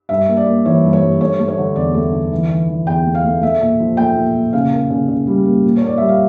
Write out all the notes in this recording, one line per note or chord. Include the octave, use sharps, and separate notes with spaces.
G2 E5
A#3
D5
A#3
E3 C#5
G2
C#5
G2
A3 C#5
A3
C#5
D3
E2 D5
A3
D3
E3
E3
E3
E2 G5
A3
F5
A3
A3 E5
A#2
F3
A3 G5
A#2
A#2
C#3 F5
A#3
C#3
C#3
G3
A#3
A#2
C#5
A#3 D5
G3 E5
F5